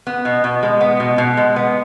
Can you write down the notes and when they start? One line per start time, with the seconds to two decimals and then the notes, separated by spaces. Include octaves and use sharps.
0.07 B3
0.25 B2
0.44 B2
0.63 G#3
0.81 B3
1.00 B2
1.18 B2
1.37 G#3
1.56 B3